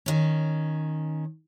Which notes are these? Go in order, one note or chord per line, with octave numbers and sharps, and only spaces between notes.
D#3 C#4